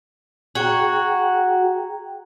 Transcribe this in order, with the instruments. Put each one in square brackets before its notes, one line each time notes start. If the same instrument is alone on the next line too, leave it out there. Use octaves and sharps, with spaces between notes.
[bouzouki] F#4 [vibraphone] G#4 G5 A#5